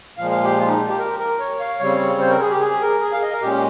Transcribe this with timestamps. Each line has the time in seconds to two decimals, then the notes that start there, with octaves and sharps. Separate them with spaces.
0.18 A#2 F3 G#3 F5
0.31 F5
0.44 G4
0.59 F4
0.68 D#4
0.89 G4
0.99 A#4
1.19 A#4
1.40 C#5
1.60 F5
1.79 C#3 G3 C4 C#5
2.00 C#5
2.20 C5
2.30 A#4
2.41 G#4
2.51 G4
2.61 G#4
2.82 A#4
3.02 G#4
3.12 F5
3.22 D#5
3.33 A#4
3.42 A#2 G#3 C#4 G4